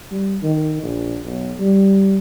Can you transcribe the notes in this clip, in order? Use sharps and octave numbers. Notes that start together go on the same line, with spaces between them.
G3
D#3
A#1
B1
G3